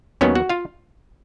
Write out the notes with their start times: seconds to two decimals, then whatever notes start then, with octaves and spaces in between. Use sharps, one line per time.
0.21 D#2 D#3 F#3 B3 C#4 C#5
0.35 F#4 F#5
0.49 F4 F5